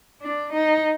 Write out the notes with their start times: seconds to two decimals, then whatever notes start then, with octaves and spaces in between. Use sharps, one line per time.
0.22 D4
0.53 D#4